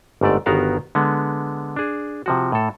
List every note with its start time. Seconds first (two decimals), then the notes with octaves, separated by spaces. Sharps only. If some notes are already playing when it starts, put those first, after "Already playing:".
0.21 G1 G#2 A3 D5
0.46 G1 D#3 B3 F#4 A#4 F5
0.95 D3 G#3 B3
1.76 D4 G#4
2.26 C3 F3 F#4
2.52 A2 A4